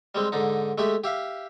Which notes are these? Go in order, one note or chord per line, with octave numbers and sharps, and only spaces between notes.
G3 G#3 C4
G#2 D3 D#4
G#3 A3 G4 E5
G4 E5 F5